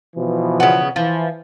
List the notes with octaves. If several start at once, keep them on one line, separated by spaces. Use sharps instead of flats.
B2 E3 F3
C#3 B3
E3 F3